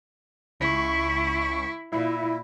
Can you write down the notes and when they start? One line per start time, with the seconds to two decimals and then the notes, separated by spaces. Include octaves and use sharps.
0.60 C#2 E4 C#6
1.92 A#2 E4